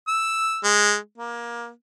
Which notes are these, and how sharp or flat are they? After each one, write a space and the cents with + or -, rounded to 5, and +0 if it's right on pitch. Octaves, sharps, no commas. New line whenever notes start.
E6 +0
G#3 -5
A#3 +20